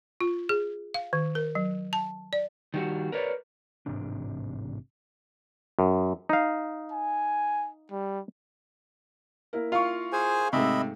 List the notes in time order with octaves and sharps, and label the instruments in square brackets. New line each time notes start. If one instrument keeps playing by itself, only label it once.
[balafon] F4
G#4
F5
D#3
A#4
F#3
A5
D5
[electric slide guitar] D#3 G3 F#4
A#4 B4 C#5 D5
[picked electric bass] A1 G#2 C3 D4
[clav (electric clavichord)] F#2
D#4 F5
[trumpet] G#5
G3
[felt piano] A#3 E4 A#4
[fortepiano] F4 [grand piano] F5 C#6
[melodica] G#4 C5 G#5
[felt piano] G#2 G#3 A3 [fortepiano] C3 [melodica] D#5 E5 B5